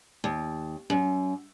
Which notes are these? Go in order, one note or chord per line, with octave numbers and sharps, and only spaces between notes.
D#2
F#2